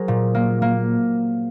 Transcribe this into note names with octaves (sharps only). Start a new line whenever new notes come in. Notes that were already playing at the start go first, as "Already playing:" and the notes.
Already playing: F#3 G#4 A#4 C5
A#2
A#3
A#3